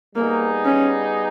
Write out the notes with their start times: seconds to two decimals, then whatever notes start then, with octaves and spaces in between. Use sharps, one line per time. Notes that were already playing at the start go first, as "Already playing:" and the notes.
0.16 G3 A#3 B3 D#4 G#4
0.65 C#4